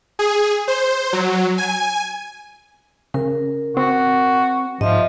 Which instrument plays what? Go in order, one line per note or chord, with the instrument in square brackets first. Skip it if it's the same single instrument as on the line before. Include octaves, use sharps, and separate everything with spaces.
[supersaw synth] G#4
C5
F#3
G#5
[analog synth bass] C#3 [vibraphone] A#4
[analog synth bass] C4 [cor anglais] F#4
[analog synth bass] G#2 [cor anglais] F3 [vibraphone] D#5 E5